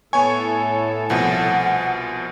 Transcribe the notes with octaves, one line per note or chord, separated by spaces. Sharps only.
A2 B3 A4 C#5 G#5 C#6
C2 B2 F3 F#5